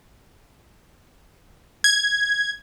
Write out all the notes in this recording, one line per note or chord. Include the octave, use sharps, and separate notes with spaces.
G#6